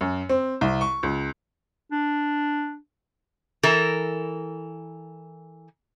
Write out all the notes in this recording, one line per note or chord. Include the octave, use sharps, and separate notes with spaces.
F#2
C4
C2
C#6
C#2
D4
E3 A4 A#4